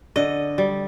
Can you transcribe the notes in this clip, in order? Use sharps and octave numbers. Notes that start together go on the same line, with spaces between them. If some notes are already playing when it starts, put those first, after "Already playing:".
D3 D#5
G3